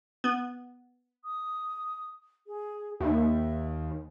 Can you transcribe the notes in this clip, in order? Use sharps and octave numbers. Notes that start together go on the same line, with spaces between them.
B3
D#6
G#4
D#2 E5